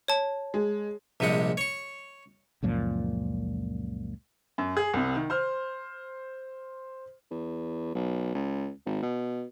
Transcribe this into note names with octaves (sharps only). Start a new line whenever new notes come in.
C#5 A5
G#3
A#1 C3 G3 G#3 F#5
C#5 C#6
C#2 F#2 A#2 F3
F#2
G#4
C2 C3
D#3
C5 C6 F6
E2
B1
C#2
G#1
B2